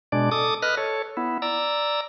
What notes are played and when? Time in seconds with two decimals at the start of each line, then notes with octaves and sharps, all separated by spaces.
0.12 B2 G#3 D4 D5
0.31 A4 D6 D#6
0.62 B4 D#5 F6 F#6
0.77 A4 C#5
1.17 B3 E4
1.42 D5 A#5 E6